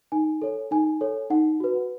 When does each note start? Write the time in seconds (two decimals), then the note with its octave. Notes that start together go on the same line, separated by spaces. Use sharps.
0.12 D#4 G#5
0.42 A4 C#5
0.71 D#4 G#5
1.01 A4 C#5
1.30 D#4 F#5
1.60 F#4 B4